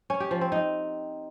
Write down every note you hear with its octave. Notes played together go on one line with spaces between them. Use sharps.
C#4
G4
F3
C4
D#4